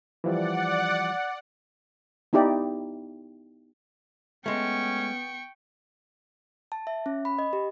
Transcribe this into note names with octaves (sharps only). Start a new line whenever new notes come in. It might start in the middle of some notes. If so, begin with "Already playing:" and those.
E3 F3 G3 D5 F#5
B3 D#4 E4 G4 D5 D#5
G#3 A3 B3 C#4 G5 C#6
A5
E5
C#4
B5
D#5
G4